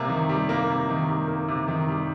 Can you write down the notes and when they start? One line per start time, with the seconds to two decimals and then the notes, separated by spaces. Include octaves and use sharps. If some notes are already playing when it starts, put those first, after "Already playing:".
Already playing: C3 G3 A#3
0.09 D#3
0.29 G3
0.49 A#3
0.69 C3
0.89 D#3
1.09 G3
1.28 A#3
1.48 C3
1.68 D#3
1.88 G3